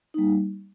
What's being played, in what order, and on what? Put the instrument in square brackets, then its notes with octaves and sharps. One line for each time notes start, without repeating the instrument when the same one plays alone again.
[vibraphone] G3 A#3 D#4